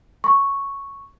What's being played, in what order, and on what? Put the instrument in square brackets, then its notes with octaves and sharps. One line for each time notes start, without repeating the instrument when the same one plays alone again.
[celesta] C#6